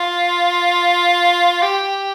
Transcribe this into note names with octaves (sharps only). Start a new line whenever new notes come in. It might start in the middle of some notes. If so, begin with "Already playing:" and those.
Already playing: F4
G4